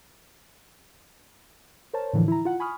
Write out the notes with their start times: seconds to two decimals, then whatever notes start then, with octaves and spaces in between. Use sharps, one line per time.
1.93 A#4 C5 C#5 A5
2.13 A2 D3 E3 F3
2.28 E4 A#5
2.45 F4 F#5
2.60 G#5 B5 C#6 D#6 F6